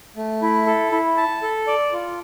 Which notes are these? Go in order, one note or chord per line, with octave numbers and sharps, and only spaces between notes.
A3
E4
A4
E4
A5
A4
D5
F4